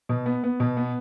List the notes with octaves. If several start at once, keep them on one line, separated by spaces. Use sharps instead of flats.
B2
B3
B3
B2
B3